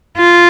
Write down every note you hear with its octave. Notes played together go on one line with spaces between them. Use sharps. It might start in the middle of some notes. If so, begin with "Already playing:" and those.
F4